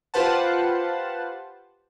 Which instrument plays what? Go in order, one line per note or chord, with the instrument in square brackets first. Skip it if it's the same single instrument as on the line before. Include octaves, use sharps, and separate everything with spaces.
[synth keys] F4 G4 B4 C5 F#5 A5